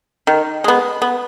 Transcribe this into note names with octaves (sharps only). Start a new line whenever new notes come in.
D#3
G#3 B3
B3